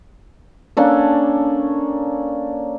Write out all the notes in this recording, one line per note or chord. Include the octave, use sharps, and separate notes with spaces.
A#3 C#4 D4 A4